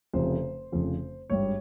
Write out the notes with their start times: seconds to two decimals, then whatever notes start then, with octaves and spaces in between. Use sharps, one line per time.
0.14 F1 F2 C#3 C5
0.72 F1 F2 C#3
1.30 G#1 G2 G3 C#5